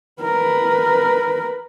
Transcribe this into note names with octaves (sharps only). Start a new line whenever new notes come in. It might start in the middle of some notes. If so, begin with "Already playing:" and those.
A#4 B4